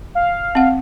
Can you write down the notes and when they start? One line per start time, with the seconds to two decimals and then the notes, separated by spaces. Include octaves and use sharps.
0.15 F5
0.55 C4 F#5